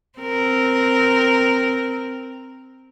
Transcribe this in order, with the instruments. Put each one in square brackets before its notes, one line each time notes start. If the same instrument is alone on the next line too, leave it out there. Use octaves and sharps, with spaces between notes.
[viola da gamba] C4 A#4